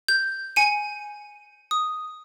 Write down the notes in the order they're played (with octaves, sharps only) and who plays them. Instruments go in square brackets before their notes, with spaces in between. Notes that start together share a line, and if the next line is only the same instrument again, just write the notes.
[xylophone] G6
G#5 C#7 D#7
D#6